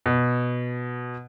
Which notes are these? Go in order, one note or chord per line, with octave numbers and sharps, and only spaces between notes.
B2